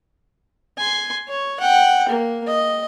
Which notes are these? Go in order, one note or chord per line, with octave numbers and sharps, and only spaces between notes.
G#5 C6
C#5
F#5 G5
A#3
D#5